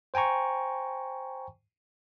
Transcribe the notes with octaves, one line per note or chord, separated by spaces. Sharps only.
C5 G5 G#5 A#5 C#6